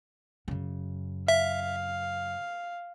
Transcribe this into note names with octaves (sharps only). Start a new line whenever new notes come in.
F#2 C#3
E5 F5